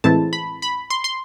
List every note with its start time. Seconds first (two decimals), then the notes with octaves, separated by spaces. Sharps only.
0.04 A2 E3 G#3 C4 E4 A5
0.33 B5
0.62 B5
0.90 C6
1.04 C6